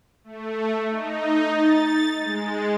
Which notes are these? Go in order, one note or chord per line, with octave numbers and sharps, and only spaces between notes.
A3
D#4
A6
G#3